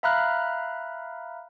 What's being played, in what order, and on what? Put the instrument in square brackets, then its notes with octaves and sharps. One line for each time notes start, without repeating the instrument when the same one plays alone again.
[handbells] E5 F5 A#5 B5 F6 F#6